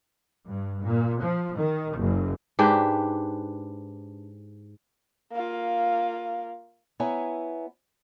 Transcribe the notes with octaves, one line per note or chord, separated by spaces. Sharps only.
G2
A#2
F3
D#3
F#1
G#2 D4 G4 B4
A#3 F4
B3 E4 C#5 E5 G#5 A#5